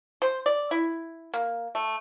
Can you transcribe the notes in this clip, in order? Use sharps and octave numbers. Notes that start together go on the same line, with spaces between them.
C5
D5
E4
A#3
A3